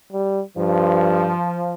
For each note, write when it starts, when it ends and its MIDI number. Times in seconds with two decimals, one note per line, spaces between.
0.12 0.42 55
0.58 1.32 43
0.58 1.74 53